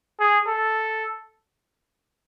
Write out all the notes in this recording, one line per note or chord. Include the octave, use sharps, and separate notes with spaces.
G#4
A4